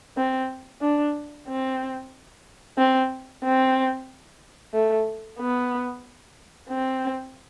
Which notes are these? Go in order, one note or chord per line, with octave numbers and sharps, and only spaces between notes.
C4
D4
C4
C4
C4
A3
B3
C4